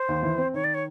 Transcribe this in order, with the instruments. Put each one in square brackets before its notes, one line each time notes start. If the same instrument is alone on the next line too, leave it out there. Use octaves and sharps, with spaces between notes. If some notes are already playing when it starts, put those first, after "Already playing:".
Already playing: [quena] C5
[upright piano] D#2
E3
C4
[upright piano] D#3 [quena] C#5
[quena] D5
C#5